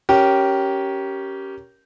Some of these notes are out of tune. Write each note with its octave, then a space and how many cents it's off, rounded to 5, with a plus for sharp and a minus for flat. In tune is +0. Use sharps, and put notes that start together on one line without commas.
C#4 +0 G4 -15 A#4 +10